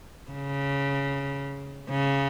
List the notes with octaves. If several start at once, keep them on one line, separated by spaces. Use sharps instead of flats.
C#3
C#3